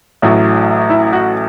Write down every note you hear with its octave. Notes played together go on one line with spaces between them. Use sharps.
A1 A2 F#3
E4
F#4